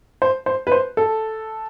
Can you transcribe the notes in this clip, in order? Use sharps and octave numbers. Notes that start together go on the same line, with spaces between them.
C5
C5
B4
C5
A4